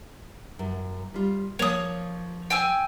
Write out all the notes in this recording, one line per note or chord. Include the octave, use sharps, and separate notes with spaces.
F#2
G3 F4
F3 A#3 C#5 D#6
G5 G#5 E6